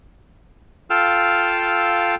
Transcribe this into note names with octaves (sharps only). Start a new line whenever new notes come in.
F4 A4 F5 G5 E6 F6